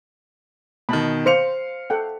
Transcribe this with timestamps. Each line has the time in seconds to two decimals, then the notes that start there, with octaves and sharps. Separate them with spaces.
0.89 B2 D#3 A5 B5
1.26 C5 F5 C#7 F7
1.90 A4 F#5 G5